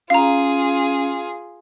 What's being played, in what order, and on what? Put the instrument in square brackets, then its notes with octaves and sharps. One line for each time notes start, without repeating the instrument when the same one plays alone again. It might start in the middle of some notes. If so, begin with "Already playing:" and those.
[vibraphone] C#4 [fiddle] F4 G#4 [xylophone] F5 A#5